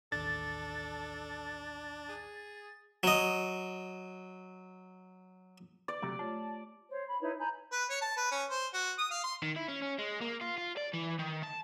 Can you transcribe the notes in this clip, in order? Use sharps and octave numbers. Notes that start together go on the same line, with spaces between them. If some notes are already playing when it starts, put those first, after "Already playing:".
A1 D#2 D4 A4 A6
G#4
F#3 D#5
D5
C3 F#3 A3 G4
A3 F4 C#5 A5
C5 C#5
B5
D#4 E4 B4 C#5
G#5 A#5 B5 G6
B4
C#5
A5
B4
C#4
C5
F#4
D#6
F5
C6
D#3
E4
C#4
C#4
G#3
A#3
F4
F4
D5
E3
D#3
A5